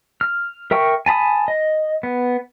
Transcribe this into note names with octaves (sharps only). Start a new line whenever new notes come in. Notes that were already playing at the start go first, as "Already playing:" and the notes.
F6
A#4 E5 G5 C#6
G#5 A5 B5 D#6
D#5
B3